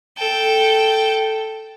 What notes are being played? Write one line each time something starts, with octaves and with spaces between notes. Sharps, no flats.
A4 G5